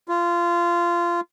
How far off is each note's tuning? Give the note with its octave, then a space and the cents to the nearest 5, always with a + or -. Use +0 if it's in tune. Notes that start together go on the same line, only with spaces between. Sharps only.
F4 -20